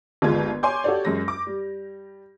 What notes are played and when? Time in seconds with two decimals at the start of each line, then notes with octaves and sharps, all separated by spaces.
0.22 G1 D#2 G#3 F4 G#6
0.63 C#5 G#5 C6 D6 G6
0.84 F#4 G4 A4 C#5 D5
1.05 F#2 G#3 A#6
1.28 D6
1.47 G3